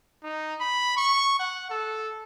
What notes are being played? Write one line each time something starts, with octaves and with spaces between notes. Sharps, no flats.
D#4
B5
C#6
F#5
A4